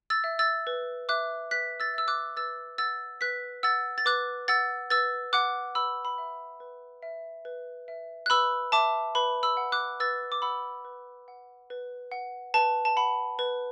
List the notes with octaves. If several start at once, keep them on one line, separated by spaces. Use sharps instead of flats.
E6 A6
E5
E6 A6
B4
E5 D6 F#6
B4 F#6 B6
E6 A6
E5 E6
D6 F#6
B4 E6 A6
F#5 E6 A6
B4 F#6 B6
F#5 E6 A6
A6
B4 D6 F#6
F#5 E6 A6
B4 E6 A6
F#5 D6 F#6
B4 B5 E6
B5
E5
B4
E5
B4
E5
F#6
B4 B5 E6
E5 A5 D6
B4 B5
B5 E6
F#5
D6 F#6
B4 E6 A6
D6
F#5 B5 E6
B4
F#5
B4
F#5
B4 A5
A5
F#5 B5
B4